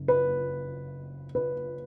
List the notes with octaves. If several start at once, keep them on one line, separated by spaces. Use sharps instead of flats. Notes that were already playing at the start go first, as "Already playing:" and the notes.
Already playing: F#1
B4
B4